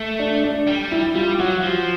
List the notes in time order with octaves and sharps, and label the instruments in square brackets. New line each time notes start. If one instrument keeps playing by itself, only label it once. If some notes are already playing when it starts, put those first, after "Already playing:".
Already playing: [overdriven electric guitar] A3
[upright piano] D4
D4
[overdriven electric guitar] G3
[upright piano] E4
[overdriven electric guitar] G3 [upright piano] F4
[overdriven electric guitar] F#3 [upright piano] F#4
[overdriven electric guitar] F3